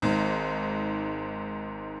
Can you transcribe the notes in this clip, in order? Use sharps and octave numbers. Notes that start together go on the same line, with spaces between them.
G#1 G#2